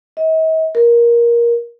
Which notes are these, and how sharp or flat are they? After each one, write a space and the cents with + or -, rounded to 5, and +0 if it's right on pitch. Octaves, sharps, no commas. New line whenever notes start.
D#5 +45
A#4 +15